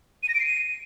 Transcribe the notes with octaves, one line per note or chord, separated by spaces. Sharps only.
D#7
A#6
D7
C7
D#7